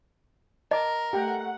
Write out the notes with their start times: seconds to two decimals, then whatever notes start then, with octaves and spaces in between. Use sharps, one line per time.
0.71 A#4 D#5 A5 D6
1.13 A3 G4 F#5 G5 A#5